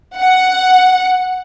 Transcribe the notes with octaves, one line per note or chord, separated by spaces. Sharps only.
F#5